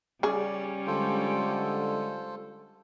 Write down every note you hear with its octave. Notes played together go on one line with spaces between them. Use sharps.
C#3 G3 C#4 G#4 D5
D3 G#3 F4 A4 C5